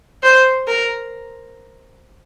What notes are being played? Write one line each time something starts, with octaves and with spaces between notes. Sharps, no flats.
C5
A#4